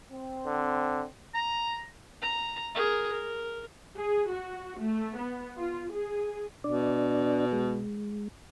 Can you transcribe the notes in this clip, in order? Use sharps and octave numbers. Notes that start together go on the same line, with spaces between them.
C4
D3
A#5
A#5
G#4 A#4
A#4
G#4
F#4
A3
B3
F4
G#4
B2 D4 D5
G#3